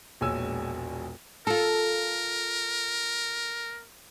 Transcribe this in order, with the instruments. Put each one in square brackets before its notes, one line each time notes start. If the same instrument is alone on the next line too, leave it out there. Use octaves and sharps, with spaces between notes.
[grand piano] E1 A#1 G#3 C#5 G#5 E6
[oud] F4 A4 [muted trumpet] A#4